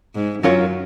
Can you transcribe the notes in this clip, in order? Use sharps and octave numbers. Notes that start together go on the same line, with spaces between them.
G#2
F#2 F#3 C#4 F4 A#4 C#5